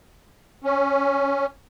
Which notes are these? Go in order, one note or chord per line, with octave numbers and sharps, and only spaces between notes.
C#4